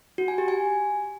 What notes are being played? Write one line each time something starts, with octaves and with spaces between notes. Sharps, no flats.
F#4
G#5
G4
G#5